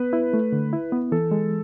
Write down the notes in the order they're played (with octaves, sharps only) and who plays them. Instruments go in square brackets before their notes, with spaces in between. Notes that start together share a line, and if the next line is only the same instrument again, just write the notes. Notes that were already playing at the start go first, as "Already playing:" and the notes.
Already playing: [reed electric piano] B3 [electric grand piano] B4
[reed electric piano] E4
A3
D3
E4
B3
[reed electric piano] E3 [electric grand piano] A4
[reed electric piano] G#3